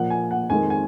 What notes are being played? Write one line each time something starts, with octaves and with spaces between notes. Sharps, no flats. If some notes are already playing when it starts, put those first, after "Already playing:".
Already playing: A#2 F3 A#3 F#5
G#5
F#5
F2 D#3 G#3 C4 G#5
G#5